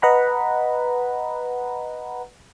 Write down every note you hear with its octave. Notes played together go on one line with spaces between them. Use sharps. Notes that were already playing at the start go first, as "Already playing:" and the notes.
B4 D#5 F#5 A#5 B5